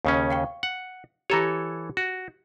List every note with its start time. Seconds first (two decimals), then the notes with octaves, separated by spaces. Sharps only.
0.05 D#2 C#3 C#4
0.30 F5 G5 C#6
0.63 F#5
1.30 E3 G4 A4 C#5 A#5 A#6
1.97 F#4